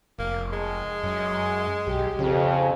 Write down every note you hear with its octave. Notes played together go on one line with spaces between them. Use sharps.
F1 A#3
G#3
F#2
B1 G4
F2 C#3